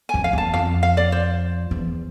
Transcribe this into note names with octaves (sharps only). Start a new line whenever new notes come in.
F2 G#5
F5
E2 A5
F2 F5
F5
D5
C5
E2